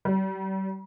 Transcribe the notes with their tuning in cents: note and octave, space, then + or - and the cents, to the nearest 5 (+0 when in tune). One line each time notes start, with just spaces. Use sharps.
G3 -40